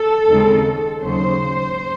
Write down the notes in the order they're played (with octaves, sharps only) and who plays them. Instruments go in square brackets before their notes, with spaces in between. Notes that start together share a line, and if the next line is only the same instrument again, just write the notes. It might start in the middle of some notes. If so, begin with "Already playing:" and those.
Already playing: [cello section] A4
D#2 C#3 G#3 C4 D#4
D#2 C#3 F#3 C#4 C5